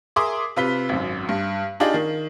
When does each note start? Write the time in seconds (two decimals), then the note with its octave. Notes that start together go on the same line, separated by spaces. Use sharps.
0.16 G#4 A#4 E5 C6 D6 D#6
0.56 C3 F4 B4 B6 G7
0.89 G#1 F#2
1.29 G2
1.80 D4 D#4 F4 G4 G#4 D5
1.94 D#3